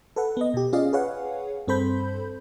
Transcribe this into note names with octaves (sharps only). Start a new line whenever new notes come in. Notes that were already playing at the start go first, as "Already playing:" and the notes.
A4 B4 F#5
B3 D#5
B2 G4
C#4 F4 G#4 D5 D#5 F5
G#4 B4 C#5 F5 F#5
G2 C4 A4 C5 B5 G6